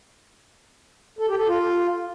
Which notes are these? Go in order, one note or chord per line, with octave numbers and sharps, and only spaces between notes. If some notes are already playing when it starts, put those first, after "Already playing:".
A4
G4
A4
F4